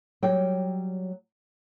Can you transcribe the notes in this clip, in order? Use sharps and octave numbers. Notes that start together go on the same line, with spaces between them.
F#3 G3 G5